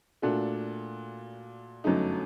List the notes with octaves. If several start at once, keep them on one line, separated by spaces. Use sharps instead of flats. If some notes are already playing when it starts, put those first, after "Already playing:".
A#2 A3 D4 F#4
G1 F#2 F#3 A3 D#4